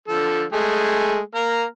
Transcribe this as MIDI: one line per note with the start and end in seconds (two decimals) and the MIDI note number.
0.08 0.44 50
0.08 0.44 53
0.08 0.44 69
0.53 1.19 56
0.53 1.19 57
0.53 1.19 68
1.35 1.64 58
1.35 1.64 82
1.35 1.64 89